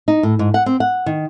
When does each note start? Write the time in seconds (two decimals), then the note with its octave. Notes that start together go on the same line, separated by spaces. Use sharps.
0.08 D#4
0.23 A2
0.39 G#2
0.54 F#5
0.66 C4
0.80 F#5
1.06 D#3